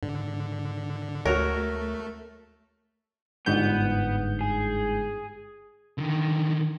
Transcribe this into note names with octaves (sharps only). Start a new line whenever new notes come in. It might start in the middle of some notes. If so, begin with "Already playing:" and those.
G#2 D3
D2 A3 F#4 A#4 C#5
G1 G#2 B3 G6
G#4
D3 D#3